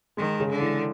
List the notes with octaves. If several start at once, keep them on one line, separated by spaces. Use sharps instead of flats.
D#3 G#3
C#3
D3
E3